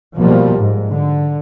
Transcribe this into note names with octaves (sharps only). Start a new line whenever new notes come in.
B2 F3 G3 A#3
G#2
D3